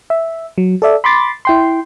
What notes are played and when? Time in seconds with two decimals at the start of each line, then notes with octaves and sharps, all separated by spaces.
0.10 E5
0.58 F#3
0.82 A4 D5 E5
1.04 B5 C6 D6 A6
1.45 E4 G5 C6